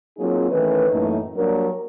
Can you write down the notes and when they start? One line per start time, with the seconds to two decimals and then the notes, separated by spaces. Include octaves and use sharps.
0.18 F#3 A#3 C4 D#4 F4 G#4
0.51 D#3 E3 A3 C#4 B4
0.91 F#2 A2 E3 A3 A#3 D#4
1.36 F#3 G3 A#3 D4 A#4